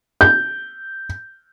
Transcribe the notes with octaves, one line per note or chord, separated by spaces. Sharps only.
G6